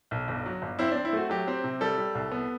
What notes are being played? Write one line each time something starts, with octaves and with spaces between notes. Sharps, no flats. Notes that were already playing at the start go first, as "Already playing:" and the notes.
B1
G1
F#3
G1
C4 E4
D4
C4
E4
A3 F#4
F#3 G4
C4
C3
G3 A4
G3
C2
B3